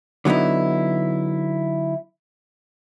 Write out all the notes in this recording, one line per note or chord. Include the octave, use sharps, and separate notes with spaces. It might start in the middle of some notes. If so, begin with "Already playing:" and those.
D3 F#3 B3 D#4 E4